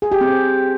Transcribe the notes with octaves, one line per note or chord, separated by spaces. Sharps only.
G#4
G4
C4